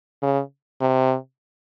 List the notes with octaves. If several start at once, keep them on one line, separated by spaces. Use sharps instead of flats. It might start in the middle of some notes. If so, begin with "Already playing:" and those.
C#3
C3